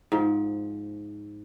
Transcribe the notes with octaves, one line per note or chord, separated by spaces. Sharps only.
G#2 F3